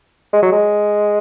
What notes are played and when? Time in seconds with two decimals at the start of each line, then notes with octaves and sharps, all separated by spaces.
0.33 G#3
0.43 F#3
0.52 G#3